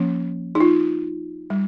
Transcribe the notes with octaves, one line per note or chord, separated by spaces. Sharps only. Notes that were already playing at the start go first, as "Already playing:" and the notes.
Already playing: F3 A#3 C#4
D#4
F4
G3